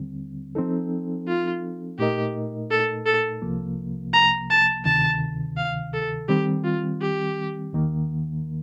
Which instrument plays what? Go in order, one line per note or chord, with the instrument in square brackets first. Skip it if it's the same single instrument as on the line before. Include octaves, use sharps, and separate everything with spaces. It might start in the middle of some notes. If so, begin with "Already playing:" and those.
Already playing: [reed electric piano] D#2 D3 G3 C4
F3 C4 D#4 A4
[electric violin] F4
[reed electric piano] A#2 A3 D#4 A#4 D#5 [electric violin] G4
[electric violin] A4
A4
[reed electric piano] C2 C3 F3 A#3
[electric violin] A#5
A5
[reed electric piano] D2 C3 D#3 [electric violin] A5
[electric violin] F5
A4
[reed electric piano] D#3 G3 C4 [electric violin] G4
[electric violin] F4
G4
[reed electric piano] D#2 D#3 A#3